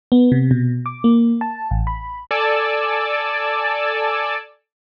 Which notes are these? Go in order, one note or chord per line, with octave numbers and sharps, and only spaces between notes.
B3
C3
B2
D6
A#3
A5
A1
B5
A4 D5 G#5 A5 D6 E6